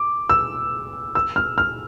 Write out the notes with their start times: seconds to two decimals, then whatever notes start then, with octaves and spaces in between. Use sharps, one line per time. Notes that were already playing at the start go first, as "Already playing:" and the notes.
Already playing: D6
0.29 E6
1.15 E6
1.36 F6
1.58 F6